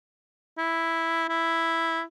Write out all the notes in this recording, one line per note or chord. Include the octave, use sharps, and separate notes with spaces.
E4
E4